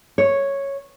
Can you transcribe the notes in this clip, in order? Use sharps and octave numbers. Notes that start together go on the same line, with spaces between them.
C#5